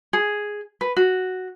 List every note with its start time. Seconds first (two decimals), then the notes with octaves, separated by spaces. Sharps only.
0.13 G#4
0.81 B4
0.96 F#4